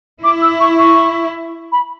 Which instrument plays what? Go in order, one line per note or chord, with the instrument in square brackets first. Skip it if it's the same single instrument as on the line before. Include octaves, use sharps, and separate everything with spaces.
[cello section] E4 [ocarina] D6
[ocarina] E6
C#6
C#6
B5